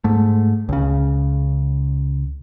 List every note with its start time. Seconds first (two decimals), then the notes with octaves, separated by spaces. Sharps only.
0.04 G#2 A3
0.69 C#2 C#3